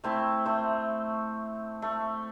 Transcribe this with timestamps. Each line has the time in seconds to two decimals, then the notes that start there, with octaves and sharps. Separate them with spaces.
0.04 A3 C4 E4
0.45 A3 C5
1.82 A3